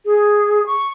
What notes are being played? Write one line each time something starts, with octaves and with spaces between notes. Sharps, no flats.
G#4
C#6